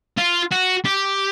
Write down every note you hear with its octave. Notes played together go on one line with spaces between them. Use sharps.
F4
F#4
G4